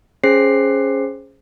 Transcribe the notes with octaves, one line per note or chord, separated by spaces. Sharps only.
C#4 G#4 C5 C7